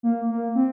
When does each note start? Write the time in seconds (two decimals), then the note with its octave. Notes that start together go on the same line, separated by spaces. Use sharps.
0.03 A#3
0.30 A#3
0.55 C4